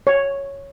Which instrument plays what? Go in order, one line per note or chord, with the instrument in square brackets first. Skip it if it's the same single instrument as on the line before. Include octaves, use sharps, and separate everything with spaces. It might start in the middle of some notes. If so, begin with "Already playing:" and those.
[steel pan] C#5